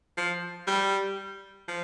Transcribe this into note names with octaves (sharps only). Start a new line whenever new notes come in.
F3
G3
F3